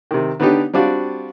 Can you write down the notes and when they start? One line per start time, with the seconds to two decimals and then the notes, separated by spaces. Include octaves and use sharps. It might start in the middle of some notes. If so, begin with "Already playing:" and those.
0.11 C3 D#3
0.40 D3 B3 D4 D#4 G4
0.74 G3 C4 D4 F4 F#4